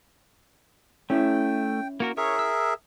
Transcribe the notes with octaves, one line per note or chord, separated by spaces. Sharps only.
A3 C#4 E4 G5
A#3 F#4 A#4
G#4 A#4 C#5 E5
E6